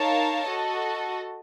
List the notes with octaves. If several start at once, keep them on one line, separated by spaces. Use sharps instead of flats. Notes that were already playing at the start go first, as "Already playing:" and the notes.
Already playing: D#4 A#4 C#5 F5 A5
F#4 A4 D#5